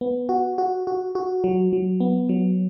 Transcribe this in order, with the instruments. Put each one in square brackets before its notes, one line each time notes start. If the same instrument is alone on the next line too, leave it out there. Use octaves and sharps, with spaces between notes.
[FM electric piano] B3
F#4
F#4
F#4
F#4
F#3
F#3
B3
F#3